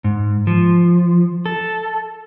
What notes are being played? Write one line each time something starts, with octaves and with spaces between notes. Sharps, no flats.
G#2
F3
A4